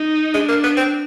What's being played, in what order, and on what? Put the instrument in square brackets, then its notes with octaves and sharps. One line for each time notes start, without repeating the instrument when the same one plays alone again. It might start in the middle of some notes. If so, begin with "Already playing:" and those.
Already playing: [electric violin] D#4
[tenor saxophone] G#3 [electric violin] D4
[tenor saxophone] A#3
B3
C4